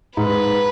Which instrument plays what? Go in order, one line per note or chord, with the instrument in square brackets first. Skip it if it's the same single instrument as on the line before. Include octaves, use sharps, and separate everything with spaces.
[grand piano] G#2 [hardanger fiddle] B4